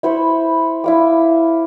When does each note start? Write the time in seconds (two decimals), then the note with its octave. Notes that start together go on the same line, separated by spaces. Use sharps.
0.03 E4 C5 B5 C#6
0.84 E4 F5 D6